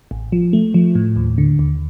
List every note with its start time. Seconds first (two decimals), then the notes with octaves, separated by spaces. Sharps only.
0.11 A1
0.32 F3
0.53 A3
0.74 F3
0.95 A2
1.16 D#2
1.38 D3
1.59 D#2